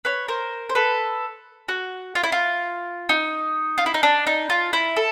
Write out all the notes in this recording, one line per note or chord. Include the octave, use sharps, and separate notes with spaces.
B4 C#5
A#4 C5
C5
A4 B4
F#4
F4
E4
F4
D#4
F4
E4
D#4
D4
D#4
F4
E4
A4